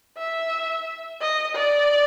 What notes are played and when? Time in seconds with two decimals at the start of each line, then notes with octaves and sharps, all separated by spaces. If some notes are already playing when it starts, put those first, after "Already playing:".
0.18 E5
1.21 D#5
1.56 D5